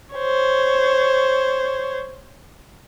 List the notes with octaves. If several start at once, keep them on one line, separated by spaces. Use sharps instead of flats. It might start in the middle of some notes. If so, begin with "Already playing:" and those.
C5 C#5